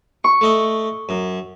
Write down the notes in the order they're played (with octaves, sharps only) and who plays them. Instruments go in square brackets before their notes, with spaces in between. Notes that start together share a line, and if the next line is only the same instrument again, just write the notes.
[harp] C#6
[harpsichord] A3 D#5
F#2